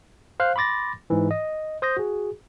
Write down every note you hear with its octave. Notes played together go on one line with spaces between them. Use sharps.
C5 F5 F#6
B5 C6 D6 A6 A#6
G#2 E3
D#5
C5 D#6 G6 A#6
F#4 G#4